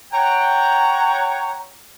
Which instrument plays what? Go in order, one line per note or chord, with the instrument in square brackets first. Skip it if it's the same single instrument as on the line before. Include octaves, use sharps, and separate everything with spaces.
[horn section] C#5 F#5 G5 [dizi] A#5